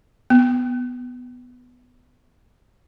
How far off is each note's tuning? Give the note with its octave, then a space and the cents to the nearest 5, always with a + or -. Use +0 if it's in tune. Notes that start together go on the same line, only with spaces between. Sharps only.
B3 +5